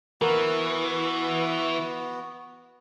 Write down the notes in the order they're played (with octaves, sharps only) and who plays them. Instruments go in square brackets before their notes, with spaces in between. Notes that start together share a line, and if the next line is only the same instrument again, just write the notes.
[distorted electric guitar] E3 [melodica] B3 F#4 [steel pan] A#4